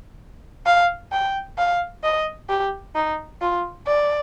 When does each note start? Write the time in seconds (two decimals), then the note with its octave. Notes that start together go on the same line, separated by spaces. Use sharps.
0.66 F5
1.12 G5
1.58 F5
2.03 D#5
2.49 G4
2.95 D#4
3.41 F4
3.87 D5